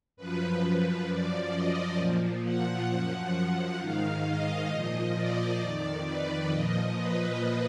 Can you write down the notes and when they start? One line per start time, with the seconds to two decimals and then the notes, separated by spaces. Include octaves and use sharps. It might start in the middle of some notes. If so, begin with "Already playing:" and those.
0.17 F#2 F3 B4
0.61 B4
1.07 F#2 F3 D5
1.53 D#5
1.97 A#2 F3
2.43 F#5
2.88 F#2 F3 F#5
3.79 G#2 D#3 F5
4.24 D#5
4.70 A#2 F3 D#5
5.15 D5
5.60 F2 D#3 D5
6.05 B4
6.51 A#2 F3 D#5
6.96 B4